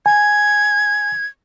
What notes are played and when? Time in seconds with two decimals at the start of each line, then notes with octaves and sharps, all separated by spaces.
0.06 G#5 G#6